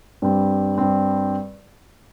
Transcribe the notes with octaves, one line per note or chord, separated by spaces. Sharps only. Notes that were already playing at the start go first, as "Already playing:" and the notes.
G2 G3 C4
G2 G3 C4